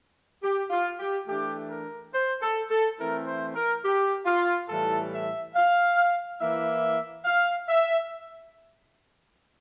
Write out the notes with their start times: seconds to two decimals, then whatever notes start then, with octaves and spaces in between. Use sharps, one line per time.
0.42 G4
0.70 F4
0.98 G4
1.27 E3 A3 D4 G4
1.69 A#4
2.12 C5
2.41 A4
2.69 A4
2.98 E3 A3 C4 E4 A#4
3.26 C5
3.54 A#4
3.83 G4
4.25 F4
4.68 A2 E3 G3 A4
5.11 E5
5.53 F5
6.39 E3 A#3 E4 E5
7.24 F5
7.67 E5